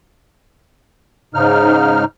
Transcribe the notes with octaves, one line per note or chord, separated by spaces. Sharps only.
G#2 C#3 D#4 F6